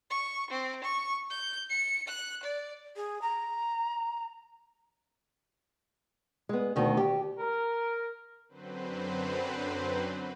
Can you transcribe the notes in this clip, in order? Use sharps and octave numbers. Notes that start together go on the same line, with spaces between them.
C#6
C4
C#6
G6
C#7
F#6
D5
G#4
A#5
G#3 B3
D2 B2 D#3
G4
A#4
F#2 D3 F#3 C4 B4 C5